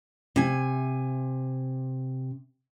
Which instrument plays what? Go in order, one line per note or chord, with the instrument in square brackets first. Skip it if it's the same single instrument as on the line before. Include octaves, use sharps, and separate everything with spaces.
[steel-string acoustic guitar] C3 G#5